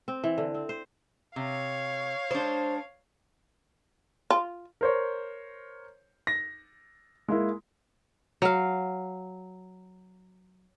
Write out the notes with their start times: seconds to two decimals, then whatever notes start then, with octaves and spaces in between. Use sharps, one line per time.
0.08 C4
0.24 E3
0.38 D3
0.54 C4
0.69 C5
1.36 C3 C#5 F5
2.31 G#3 D4 C5
4.30 F4
4.81 A#4 C5 C#5
6.27 A#6
7.28 G#3 A#3 E4
8.42 F#3 F5